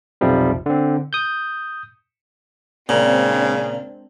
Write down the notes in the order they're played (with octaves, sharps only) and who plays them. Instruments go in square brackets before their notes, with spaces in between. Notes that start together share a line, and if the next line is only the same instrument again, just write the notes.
[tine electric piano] B1 F2 C3 F3 G3
D3 C4
D#6 G6
[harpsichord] A#2 [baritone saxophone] C#3 [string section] G#3 C4 D4